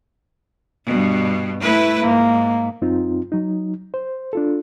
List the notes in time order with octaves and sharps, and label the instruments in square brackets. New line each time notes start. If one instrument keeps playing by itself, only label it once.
[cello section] G2 B2
A3 E4 B4
[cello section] G#2 [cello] A#3
[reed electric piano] F#2 C4 D#4 F4
F#3 D#4
C5
D4 F4 A4